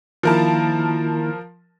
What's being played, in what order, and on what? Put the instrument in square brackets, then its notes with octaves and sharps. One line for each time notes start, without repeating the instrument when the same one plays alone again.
[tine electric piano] D#3 A#3 E4 [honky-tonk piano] F3 A#4 A5